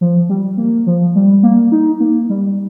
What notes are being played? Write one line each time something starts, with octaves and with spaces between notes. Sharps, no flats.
F3
G3
A#3
F3
G3
A#3
D#4
A#3
G3